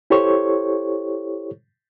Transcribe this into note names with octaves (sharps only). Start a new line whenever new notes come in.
E4 G4 A4 C5 C#5 C#6